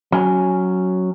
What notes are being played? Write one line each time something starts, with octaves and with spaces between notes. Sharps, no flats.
F#3 C#4